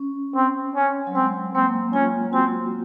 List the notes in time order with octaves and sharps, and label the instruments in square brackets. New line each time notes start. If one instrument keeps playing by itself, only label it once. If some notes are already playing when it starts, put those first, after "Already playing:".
Already playing: [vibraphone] C#4
[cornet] C4
C#4
[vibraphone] F#3
[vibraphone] G#3 [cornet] C4
[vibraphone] A#3 [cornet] C4
[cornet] C#4 [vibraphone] F4
[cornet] C4 [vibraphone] F#4